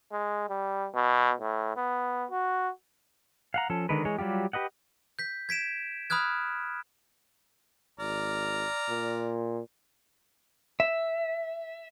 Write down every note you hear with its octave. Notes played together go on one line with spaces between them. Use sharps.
G#3
G3
B2
A2
B3
F#4
F5 F#5 A#5
F3 C#4 A4
D3 D#3 G#3 A#4 B4
E3 G#3 G#4 C#5
F#3 G3 F4 G4
G4 B4 D#5 F#5
G6 B6
G#6 B6 D7 E7
B5 D#6 F6 F#6 G#6
G#1 D5 A#5 F6
A#2
E5